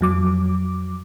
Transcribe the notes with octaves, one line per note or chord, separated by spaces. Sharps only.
F2 F#3 D6